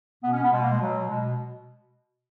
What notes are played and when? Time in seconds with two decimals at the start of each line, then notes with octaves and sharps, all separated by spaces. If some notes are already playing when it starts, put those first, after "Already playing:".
0.23 B2 B3
0.33 C#4
0.42 B3
0.51 B2 G#3
0.60 A#3
0.70 G#3
0.79 B2 F#3
1.08 B2 G#3